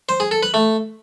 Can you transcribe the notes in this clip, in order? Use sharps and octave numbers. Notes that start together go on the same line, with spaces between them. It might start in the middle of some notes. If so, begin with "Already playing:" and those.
C5
G#4
A4
B4
A3